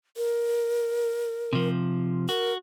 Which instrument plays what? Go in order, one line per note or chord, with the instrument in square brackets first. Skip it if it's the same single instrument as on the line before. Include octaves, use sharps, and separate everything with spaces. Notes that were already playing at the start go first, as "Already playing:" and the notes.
[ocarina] A#4
[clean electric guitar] C3 F3
[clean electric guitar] F#4 [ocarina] A#4